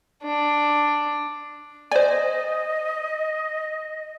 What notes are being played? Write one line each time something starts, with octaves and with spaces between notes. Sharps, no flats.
D4
C5 D5 D#5 G#5